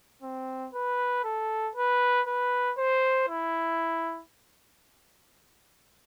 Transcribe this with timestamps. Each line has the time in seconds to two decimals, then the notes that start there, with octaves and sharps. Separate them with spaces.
0.22 C4
0.73 B4
1.24 A4
1.76 B4
2.27 B4
2.78 C5
3.29 E4